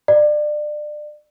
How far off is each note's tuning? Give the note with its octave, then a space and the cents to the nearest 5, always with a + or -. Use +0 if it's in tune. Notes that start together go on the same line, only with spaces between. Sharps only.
D5 +25